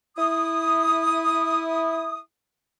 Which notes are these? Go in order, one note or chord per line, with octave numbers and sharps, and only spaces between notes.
E4 D#6